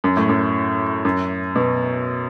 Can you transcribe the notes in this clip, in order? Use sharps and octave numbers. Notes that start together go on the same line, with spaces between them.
F#2
A2
F#2
F#2
B2